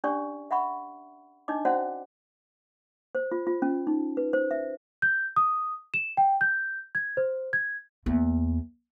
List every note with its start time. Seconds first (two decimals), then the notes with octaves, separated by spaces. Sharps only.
0.04 C#4 D4 G4 D5 C#6
0.51 E5 F#5 B5 C#6
1.48 D4 D#4 D#5 D6
1.65 C#4 F#4 C5 D5 E5 F#5
3.15 C5
3.31 F4
3.47 F4
3.62 C#4
3.87 D#4
4.17 B4
4.33 C5
4.51 E5
5.02 G6
5.36 D#6
5.94 E7
6.17 G5
6.41 G6
6.95 G#6
7.17 C5
7.53 G#6
8.06 E2 A#3